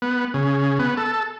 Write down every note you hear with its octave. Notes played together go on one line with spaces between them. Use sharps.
B3
C#3
B3
A4